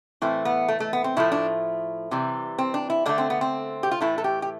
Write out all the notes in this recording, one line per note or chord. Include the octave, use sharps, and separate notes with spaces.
A2 E3 A3 C4
B3
A3
A3
B3
C4
A2 F3 A3 E4
D4
C3 E3 G3
C4
D4
E4
D3 A3 D4
C4
B3
C4
G4
F4
A2 E3 A3 E4
A4
G4
G4